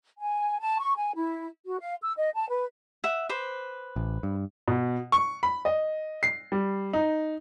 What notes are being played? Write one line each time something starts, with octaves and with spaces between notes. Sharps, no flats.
G#5
A5
C#6
G#5
E4
F#4
F5
E6
D#5
A5
B4
E5 F#5
B4 C5 D6
A1
G2
B2
C#6
B5
D#5
C7
G3
D#4